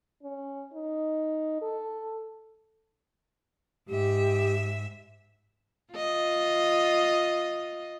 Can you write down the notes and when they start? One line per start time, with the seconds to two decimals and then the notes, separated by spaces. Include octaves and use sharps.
0.23 C#4
0.74 D#4
1.61 A4
3.88 G#2 G4 E5
5.93 F4 D#5